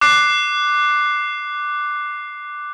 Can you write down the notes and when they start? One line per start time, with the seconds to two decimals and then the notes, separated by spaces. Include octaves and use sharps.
0.01 D6 F#6 C7